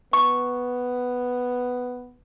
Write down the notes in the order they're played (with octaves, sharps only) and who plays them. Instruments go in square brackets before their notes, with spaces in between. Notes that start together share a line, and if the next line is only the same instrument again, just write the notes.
[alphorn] B3 [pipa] C#6